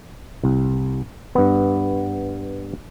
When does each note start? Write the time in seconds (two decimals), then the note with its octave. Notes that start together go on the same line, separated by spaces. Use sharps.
0.44 C2
1.35 G2 B3